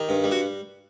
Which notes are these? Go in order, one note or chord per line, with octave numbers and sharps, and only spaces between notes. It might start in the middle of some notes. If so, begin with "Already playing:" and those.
Already playing: D#3 G4
G2
G3
F#4